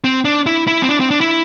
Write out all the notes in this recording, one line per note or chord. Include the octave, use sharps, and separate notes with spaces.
C4
D4
E4
E4
C4
D4
C4
D4
E4